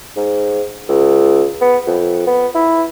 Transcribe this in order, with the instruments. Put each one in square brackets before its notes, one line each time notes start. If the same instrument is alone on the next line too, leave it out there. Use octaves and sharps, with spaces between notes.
[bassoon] G#2
C#2
B3
F2
B3
E4